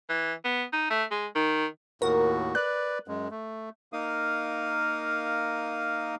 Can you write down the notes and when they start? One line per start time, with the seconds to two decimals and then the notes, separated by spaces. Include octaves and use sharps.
0.09 E3
0.44 B3
0.73 D#4
0.90 A3
1.11 G#3
1.36 D#3
2.02 D#2 A2 F#4 A#4
2.55 B4 D5 F#6
3.08 F#2 G#3
3.31 A3
3.93 A#3 D#4 A#4 F5 D#6